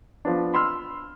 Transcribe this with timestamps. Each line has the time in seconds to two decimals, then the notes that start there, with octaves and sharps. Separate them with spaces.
0.25 F3 B3 D4
0.54 B5 C6 E6 F6